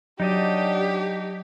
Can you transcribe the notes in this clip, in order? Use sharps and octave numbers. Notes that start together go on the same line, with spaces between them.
F#3 D4 D#4 G4 D5 D#5